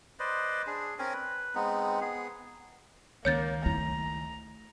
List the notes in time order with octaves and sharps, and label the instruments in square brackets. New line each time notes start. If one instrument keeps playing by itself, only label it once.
[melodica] B4 C5 D5 D#5
D4 G#4
C4 C#4 A#4 G#5
B4
G#3 B3 C4 D#4
B3 G#4
[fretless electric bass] C#2 D#3 C#4 [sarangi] A#3 [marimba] C#5 G6 A6
[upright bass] A3 E4 [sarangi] A#5